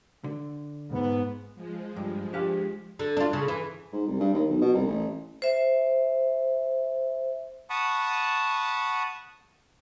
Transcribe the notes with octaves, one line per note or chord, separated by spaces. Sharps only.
D3
G#2 B3
F3 G#3
G2
D4 G4 F5
D3
D4 F4
C#3
E3
G#2
C2
G2
D#2
B1
B2
C2
A1
C5 E5
F#5 A5 B5 C#6 D#6